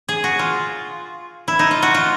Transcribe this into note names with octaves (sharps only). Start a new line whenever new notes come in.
G#4
F#4
F4
E4
D#4
F4
F#4
F4